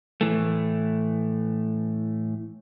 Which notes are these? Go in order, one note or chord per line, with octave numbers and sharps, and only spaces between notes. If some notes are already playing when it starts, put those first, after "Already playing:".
A2 E3 A3